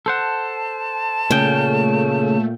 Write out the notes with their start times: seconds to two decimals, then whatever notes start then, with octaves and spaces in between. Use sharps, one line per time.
0.06 A4 C5 F#5 A5
1.31 A#2 C#3 A3 G5